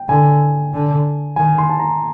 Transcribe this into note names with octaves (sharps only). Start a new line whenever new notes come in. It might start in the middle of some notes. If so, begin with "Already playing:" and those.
Already playing: G5
D3 G#5
D3
D#3 G#5
C6
A5
A#5